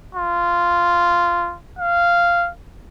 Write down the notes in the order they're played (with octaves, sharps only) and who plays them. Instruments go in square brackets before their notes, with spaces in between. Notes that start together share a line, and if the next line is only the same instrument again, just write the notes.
[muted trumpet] F4
F5